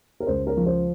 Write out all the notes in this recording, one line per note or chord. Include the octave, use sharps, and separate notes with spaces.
A#4
C#2 C5
A#4
F3
C5